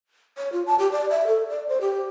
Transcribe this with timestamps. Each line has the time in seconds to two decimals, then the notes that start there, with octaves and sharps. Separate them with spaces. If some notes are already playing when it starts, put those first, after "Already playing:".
0.38 C#5
0.52 F4
0.67 A5
0.79 G4
0.92 D5
1.10 E5
1.27 A4
1.49 D5
1.68 C5
1.81 G4